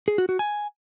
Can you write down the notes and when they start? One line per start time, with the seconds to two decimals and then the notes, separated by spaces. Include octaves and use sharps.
0.08 G#4
0.18 F#4
0.29 F#4
0.39 G#5